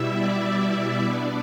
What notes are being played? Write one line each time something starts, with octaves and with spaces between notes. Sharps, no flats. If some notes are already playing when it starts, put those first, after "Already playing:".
Already playing: B2 G3 E4 E5
D5
D5
D5
B2 B3 D4 D5